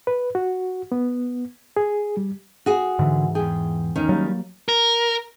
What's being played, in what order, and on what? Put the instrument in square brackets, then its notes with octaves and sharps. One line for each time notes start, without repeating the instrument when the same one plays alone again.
[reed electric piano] B4
F#4
B3
G#4
G3
[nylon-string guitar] F#4 G#4
[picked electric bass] G#2 E3 [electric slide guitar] D3
[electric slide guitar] E2 G5 [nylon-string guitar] G#4
[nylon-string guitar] D#2 D#3 C#4
[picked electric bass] F#3 A#3 [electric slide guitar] G3
[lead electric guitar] A#4